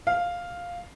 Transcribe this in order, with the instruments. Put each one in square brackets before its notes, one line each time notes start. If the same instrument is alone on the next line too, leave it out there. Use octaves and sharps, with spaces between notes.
[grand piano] F5